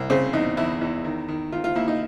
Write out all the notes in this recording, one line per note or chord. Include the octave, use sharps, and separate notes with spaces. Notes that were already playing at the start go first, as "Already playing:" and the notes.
Already playing: C2
C#3 C4
E2 D#4
E2 E4
E2
D#3
D#3
D#3 F4
F4
D#2 E4
D#4